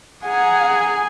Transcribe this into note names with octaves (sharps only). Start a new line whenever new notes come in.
G#4 F#5 G#5 A#5